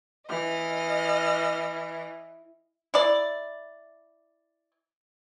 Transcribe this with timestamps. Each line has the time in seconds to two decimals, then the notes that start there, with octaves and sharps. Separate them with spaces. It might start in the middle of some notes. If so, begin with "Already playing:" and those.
0.29 E3 D#5 F6
2.94 E4 D5